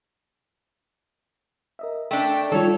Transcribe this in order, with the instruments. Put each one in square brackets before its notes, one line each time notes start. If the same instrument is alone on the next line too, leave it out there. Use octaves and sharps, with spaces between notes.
[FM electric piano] A#4 D#5 E5
[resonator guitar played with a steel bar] A3 D4 [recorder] G5
[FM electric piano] D#3 G3 F4 [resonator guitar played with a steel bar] A4 [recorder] C#5